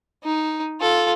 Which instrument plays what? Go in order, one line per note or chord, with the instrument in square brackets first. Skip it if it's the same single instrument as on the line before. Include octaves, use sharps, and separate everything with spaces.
[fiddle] D#4
F4 A4